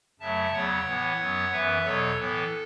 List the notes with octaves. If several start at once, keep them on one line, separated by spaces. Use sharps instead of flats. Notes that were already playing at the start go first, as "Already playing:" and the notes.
F#2 C#3 F#3 A3 E5 A5
E2 C#3 F#3 B3 C#5 F#5
A2 E3 B3
F#2 F#3 B3
F#2 E3 B3 B4 E5
E2 B2 F#3 B3 A4 C#5
A2 E3 B3 A4